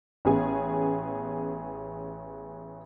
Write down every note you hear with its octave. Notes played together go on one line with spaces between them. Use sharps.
A1 B3 C#4 G#4 G#5